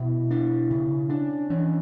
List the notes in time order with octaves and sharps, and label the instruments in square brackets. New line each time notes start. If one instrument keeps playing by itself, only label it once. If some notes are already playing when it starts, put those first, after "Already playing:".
Already playing: [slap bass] B2 B3 [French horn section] E4
[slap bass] D4
C#3
[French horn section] C#4 [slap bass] D4
[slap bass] E3 [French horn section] C#4